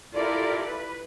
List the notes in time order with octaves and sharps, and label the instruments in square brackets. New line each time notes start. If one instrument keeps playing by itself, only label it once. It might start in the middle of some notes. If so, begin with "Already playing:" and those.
[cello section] E4 F4 G4 A4 A#4 D5
B4